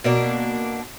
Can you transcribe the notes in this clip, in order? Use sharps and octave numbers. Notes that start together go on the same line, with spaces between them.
B2 A#3 D4